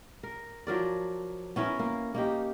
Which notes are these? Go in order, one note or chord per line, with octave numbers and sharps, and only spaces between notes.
A#4
F3 F#3 A#4 D5
B3 C#4 E4 A#4
A#3 A#4
A#3 D#4 G4